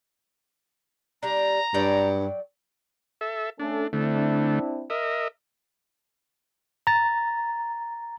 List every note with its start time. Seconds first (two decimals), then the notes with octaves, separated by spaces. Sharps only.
1.23 G3 D4 A#5
1.74 G2 F#3 D5 G5
3.21 A4 E5
3.59 A3 C#4 D4 A4
3.93 D3 A3 C4 D4 E4
4.90 A#4 D#5 E5
6.87 A#5 A6